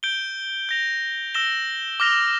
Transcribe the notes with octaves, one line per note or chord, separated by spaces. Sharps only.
G6 D7 G7
G6 A#6 F7
E6 A#6 E7 G7
D6 F6 A#6 F7